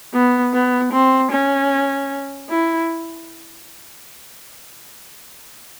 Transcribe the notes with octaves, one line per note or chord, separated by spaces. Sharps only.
B3
B3
C4
C#4
E4